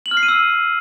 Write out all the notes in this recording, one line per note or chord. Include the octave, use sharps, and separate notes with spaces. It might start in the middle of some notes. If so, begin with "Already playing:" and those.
F#7
F6
C7
D#7
E6